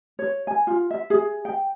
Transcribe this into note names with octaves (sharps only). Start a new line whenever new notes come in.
C#5
G#5
F4
E5
G#4
G5